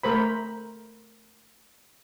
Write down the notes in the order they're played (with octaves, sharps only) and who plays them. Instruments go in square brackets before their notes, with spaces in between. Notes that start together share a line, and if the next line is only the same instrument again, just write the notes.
[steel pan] A3 A#4 C5 B5